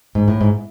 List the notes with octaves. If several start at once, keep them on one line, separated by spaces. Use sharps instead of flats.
G#2
A2
G#2